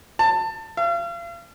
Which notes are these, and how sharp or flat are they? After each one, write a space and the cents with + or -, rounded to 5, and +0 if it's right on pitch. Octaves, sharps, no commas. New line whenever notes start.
A5 +20
F5 -40